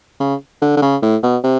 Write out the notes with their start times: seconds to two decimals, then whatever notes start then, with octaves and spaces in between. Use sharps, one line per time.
0.20 C#3
0.62 D3
0.77 D3
0.82 C#3
1.03 A2
1.23 B2
1.44 C3